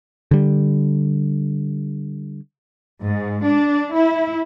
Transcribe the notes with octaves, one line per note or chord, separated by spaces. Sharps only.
D3 G3
G#2
D4
E4